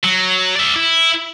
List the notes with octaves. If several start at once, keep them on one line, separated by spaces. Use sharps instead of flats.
F#3
D5 E5
E4